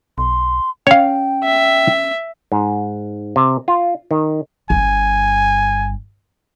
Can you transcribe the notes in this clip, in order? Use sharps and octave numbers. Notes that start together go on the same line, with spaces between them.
B1 C6
C#4 C#5 F5 G5
E5
G#2
C3
F4
D#3
G1 G2 G#5